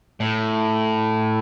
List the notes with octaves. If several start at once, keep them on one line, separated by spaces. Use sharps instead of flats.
A2